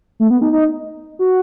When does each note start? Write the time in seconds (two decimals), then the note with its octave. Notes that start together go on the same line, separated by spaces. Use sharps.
0.20 A3
0.30 B3
0.42 D#4
0.53 D#4
1.19 F#4